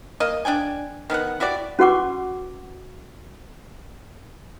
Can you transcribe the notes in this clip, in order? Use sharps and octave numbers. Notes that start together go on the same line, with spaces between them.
A#3 D#5
D4 D5 G5 G#5
D#3 B3 G#4 F#5
E4 F#4 G4 D5
C#4 F#4 B4 F#5 C#6 D6